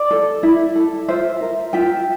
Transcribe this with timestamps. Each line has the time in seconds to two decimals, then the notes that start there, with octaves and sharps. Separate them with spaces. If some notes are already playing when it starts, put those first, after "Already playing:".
Already playing: D5
0.11 A4
0.43 E4
0.76 A4
1.08 F4 C5 E5
1.41 A#4
1.73 F4 E5 G5